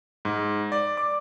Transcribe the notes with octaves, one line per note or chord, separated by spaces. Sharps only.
G#2
D5
D6